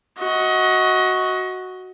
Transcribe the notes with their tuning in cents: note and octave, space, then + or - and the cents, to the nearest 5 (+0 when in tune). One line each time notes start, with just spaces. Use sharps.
F#4 +0 D#5 +25